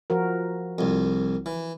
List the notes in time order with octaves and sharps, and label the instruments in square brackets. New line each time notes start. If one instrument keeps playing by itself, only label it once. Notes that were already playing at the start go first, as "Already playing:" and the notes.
[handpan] F3 F#4 A#4
[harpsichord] C2 F2
E3